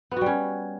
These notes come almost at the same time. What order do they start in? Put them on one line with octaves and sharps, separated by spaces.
B3 F#4 G3 C#4